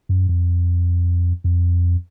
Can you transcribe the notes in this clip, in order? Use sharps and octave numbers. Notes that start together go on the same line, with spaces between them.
F#2
F2
F2